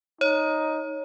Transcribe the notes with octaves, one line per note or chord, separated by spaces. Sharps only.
D#4 C#5